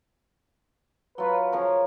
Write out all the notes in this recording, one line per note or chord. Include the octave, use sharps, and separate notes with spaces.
F#3 F4 B4 C#6
C#3 F3 A#4 C#5